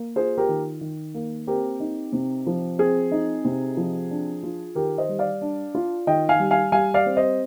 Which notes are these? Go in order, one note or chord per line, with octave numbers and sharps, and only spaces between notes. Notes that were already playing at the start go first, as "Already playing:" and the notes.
Already playing: A#3
F4 G#4 C5
G4 A#4
D#3
D#3
A#3
C4 G4 A#4
D#4
C3
F3
C4 G#4
D#4
C3
F3
D4
F4
D#3 G4 A#4
C5 D#5
G3
D5 F5
D4
F4
D#3 D#5 G5
F5 G#5
G3
F5 G#5
G3 F5 G#5
D5 F5
C4
C5 D#5